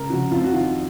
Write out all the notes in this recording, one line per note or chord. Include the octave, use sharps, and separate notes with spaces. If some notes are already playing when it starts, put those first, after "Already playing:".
Already playing: C#2 A#4
C#3 F3 F#4
F2 F4
F#4
D#3 F4